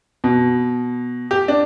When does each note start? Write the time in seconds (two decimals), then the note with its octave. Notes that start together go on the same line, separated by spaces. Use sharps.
0.24 B2
1.31 G4
1.48 D4